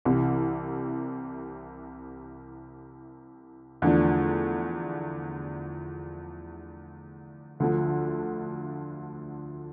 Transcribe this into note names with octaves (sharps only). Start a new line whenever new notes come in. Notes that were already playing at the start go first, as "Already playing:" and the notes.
C2 C3 E3
E2 D3 F3 A3 D4
D2 D3 F3